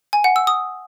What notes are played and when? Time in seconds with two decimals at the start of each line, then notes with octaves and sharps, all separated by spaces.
0.13 G#5
0.24 F#5
0.36 E6
0.47 D#6